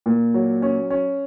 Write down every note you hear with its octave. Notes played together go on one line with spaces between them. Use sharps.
A#2
F#3
C#4
C#4